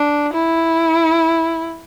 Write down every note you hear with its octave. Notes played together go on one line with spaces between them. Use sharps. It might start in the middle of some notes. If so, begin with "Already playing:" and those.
Already playing: D4
E4